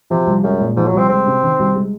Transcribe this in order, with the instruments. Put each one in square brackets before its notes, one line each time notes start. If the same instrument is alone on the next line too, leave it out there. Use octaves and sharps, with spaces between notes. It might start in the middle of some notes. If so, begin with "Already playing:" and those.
[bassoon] C3 [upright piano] F3
[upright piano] C2
[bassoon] F#2 [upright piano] G#3
[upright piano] A#2
[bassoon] G#2 [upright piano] F3
[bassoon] F#3
[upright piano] C2
[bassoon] C4
[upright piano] G#3 [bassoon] C4
[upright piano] C3
D#3
C2
G#3